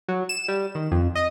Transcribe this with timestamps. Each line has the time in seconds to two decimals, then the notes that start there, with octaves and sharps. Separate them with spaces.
0.08 F#3
0.29 E7
0.48 G3
0.75 D#3
0.92 F2
1.15 D#5